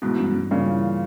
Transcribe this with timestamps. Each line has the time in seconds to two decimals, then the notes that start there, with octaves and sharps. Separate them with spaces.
0.02 G#2 B2 E3
0.18 G2
0.35 G2
0.51 G2 A#2 C#3
0.67 E3